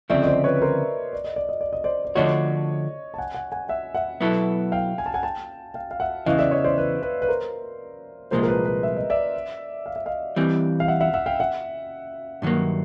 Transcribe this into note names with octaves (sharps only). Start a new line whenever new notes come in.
D2 C#3 F3 A3 C4 D5 E5
D#5
C5 D5
B4 C#5
B4
A#4 C5
D5
D#5
D5
D#5
D5
D#5
C5 D5
D5
D3 F3 A3 D4 F#4 C#5 D#5
A5
F#5 G#5
F#5 G#5
F#5 G#5
E5 F#5
E5 F#5
B2 F#3 B3 E4 A4
F5 G5
G#5
A5
F#5 G#5
G5 A5
F5 G5
F5
E5 F#5
E2 C#3 E3 D#5 F5
D5 E5
C#5 D#5
C5 D5
B4
B4
B4
A#4 C5
C2 A#2 F3 G#3 A#4 C5
A#4
B4
B4
E5
D#5
D5 E5
F5
E5
D#5 F5
E3 G3 C4
F5
E5 F#5
E5 F#5
E5 F#5
F5 G5
E5 F#5
G2 D#3 F#3 A#3